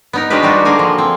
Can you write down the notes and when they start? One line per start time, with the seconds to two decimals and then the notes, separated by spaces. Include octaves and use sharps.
0.13 B3 D#4 A#4
0.30 F#3 G#3 D4 G4 A#4 B4
0.42 G3 D4 D#4 F4 F#4
0.65 D3 A#3 G#4 A#4 G#5
0.79 F3
0.98 C4